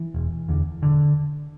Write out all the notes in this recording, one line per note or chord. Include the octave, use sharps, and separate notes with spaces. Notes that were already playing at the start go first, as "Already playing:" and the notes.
Already playing: E3
E1
E2 D3
E1 D3